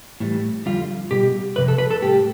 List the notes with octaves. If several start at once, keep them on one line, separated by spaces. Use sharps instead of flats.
A2 E3 G3
F2 D3 G3 F4
B2 G3 G4
F2 C3 B4
A4
B4
A4
A2 G3 G4